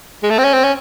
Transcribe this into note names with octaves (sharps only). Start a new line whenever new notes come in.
G#3
A3
C4
C#4
C4
C#4